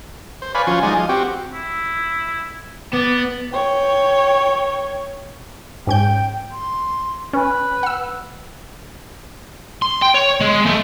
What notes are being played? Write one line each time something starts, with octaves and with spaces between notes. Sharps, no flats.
C5
B4 C#5 D5 F5 G#5 B5
F3 C#4 F4 F#4
F3 G#3 D#4 D5 G#5
F4
C4 F#4 G4
E4
B3 D5
C#5 G5
G#2 C#4 G5 G6
C6
C#4 B4
F#5 E6
C6
G5
C#5
G#3
A3